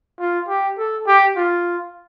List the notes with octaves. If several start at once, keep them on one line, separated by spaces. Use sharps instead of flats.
F4
G4
A4
G4
F4